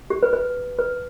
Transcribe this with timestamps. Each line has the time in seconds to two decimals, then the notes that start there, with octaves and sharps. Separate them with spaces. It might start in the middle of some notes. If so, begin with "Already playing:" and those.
0.10 G4
0.23 B4
0.33 B4
0.78 B4